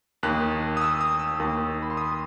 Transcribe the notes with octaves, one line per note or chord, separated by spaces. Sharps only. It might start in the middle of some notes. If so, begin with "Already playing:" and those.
D#2 D#3 F#6
D#6
E6
D#6
E6
D#2 D#3
B5
C6
D#6